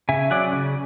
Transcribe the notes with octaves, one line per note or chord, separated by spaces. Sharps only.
C#3 E5 G#5
F#3 C#4 D5 F#5
C#3